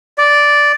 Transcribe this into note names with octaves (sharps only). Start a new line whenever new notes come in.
D5